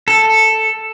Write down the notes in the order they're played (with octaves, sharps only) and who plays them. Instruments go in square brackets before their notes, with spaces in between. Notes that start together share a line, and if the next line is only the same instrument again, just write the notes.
[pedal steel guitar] A4